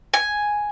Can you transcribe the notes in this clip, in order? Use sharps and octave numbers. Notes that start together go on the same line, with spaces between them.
G#5